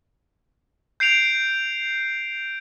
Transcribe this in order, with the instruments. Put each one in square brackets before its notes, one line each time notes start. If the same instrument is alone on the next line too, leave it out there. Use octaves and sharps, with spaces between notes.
[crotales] G6 C7 D7 F7